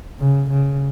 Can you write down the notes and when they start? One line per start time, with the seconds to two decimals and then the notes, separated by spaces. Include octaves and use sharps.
0.20 C#3
0.50 C#3